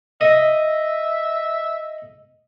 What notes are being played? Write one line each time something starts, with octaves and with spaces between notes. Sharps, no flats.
D#5 E5